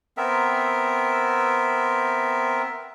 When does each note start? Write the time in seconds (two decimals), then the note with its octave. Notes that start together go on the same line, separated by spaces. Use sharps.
0.17 B3 C4 A#4 E5